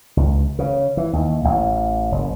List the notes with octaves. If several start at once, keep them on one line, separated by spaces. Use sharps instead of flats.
C#2
C#3
E3
D#2
A1
F#1